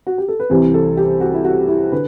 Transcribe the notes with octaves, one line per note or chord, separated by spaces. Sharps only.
F#4
G4
A4
B4
C2 C3 E3 G3 C5
A4
G4
F#4
E4
F#4
E4
D3 B4